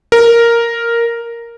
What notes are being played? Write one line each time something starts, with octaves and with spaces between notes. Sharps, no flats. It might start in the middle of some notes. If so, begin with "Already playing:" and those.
A#4